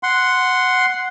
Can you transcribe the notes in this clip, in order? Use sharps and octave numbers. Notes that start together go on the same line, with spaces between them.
F#5 C6